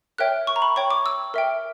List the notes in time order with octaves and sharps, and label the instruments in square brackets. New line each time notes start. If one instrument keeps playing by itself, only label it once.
[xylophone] A#4 C#5 E5 G5 F#6
C#6
A#5
B5
C#5 G5 C#6
D6
E6
A#4 E5 G5